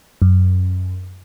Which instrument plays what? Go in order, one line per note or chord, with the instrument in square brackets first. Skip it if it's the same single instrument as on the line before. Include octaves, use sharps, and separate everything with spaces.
[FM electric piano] F#2